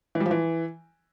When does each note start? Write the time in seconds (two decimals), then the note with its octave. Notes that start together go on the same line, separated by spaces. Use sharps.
0.15 E3
0.20 G3
0.26 F3
0.31 E3